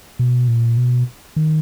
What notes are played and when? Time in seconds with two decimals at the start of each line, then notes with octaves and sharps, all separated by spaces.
0.19 B2
0.48 A#2
0.77 B2
1.36 D#3